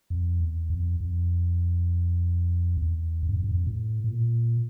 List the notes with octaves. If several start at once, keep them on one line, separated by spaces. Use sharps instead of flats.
F2
E2
F2
F2
E2
F2
G2
F2
G2
F2
A2
A2
A#2